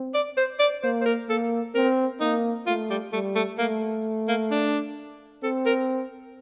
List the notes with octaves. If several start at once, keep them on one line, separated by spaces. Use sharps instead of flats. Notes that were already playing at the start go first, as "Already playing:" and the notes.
Already playing: C4
D5
C5
D5
A#3 C5
C5
A#4
A#3 A4
C4 A#4
A#3 D#4
A3 F4
G3
G3 A3
A3
A3 A#3
A#3
D4
C4 A4
A#4